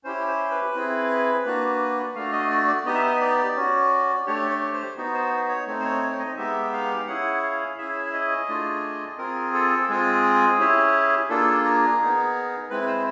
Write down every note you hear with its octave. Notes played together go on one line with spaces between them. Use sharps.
C#4 E4 G4 C5
C5
B4
C4 E4 G#4
A#3 D4 F#4
A3 D4 F#4 F5
D#5
D5
D5
B3 D#4 G4 D#5
E5
D#5
D5
C#4 F#4
A3 D4 G4 C#5
C#5
C5
B3 D#4 F#4
C5
C#5
A3 C4 D#4
C5
C#5
C#5
D#5
G#3 B3 D#4 G4 E5
F5
C#4 E4 G#4 F#5
F5
C#4 E4 G#4 E5
D#5
A3 D4 F4 G#4
C4 F4 G#4 A#4
A4
G#3 C4 F4 G#4
C#4 E4 G4
A#3 D4 F4 G#4 A4
A#4
B3 D#4 G#4
G#3 C4 E4 B4
C5